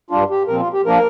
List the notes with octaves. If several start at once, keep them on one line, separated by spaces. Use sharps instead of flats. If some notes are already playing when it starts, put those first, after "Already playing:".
G2 G3 D4 F4
G4
A#2 F3 C4 A#4
F4
G4
F3 A#3 D4 A#4